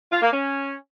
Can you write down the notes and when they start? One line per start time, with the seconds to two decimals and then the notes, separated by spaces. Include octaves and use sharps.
0.12 F4
0.22 A#3
0.32 C#4